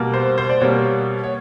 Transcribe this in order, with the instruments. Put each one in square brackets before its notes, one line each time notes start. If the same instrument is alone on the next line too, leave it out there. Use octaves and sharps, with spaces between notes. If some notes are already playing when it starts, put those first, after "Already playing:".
Already playing: [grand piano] B2 G3 A#3
C5
C5
D5
B2 G3 A#3 C#5
C#5